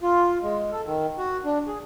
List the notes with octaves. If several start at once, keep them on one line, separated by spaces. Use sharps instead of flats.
F4
G#3
A4
D#3
F#4
D4
G#4